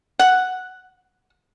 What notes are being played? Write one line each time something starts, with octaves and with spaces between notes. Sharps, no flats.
F#5